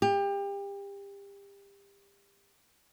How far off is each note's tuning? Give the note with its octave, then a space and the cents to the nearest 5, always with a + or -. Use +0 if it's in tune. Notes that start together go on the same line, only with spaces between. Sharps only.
G4 +30